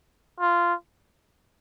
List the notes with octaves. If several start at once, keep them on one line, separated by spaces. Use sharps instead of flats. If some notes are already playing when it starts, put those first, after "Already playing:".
F4